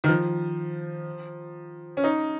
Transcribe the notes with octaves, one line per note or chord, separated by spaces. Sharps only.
D#3
F3
C#4
D#4